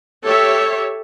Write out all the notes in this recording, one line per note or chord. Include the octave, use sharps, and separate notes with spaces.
G4 A4 C#5 E5